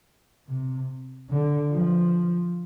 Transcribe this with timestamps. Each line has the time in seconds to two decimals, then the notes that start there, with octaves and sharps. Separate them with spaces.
0.47 C3
1.30 D3
1.71 F3